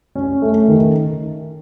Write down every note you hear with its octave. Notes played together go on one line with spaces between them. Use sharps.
C#4
A3
D#3